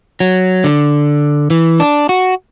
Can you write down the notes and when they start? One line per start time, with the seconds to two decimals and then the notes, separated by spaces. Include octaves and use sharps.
0.20 F#3
0.64 D3
1.50 E3
1.80 D4
2.09 F#4